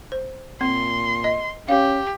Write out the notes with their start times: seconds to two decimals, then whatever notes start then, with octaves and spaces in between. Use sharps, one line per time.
0.12 C5
0.61 A#2 C4 C6
1.24 D#5
1.69 C#4 G4 F5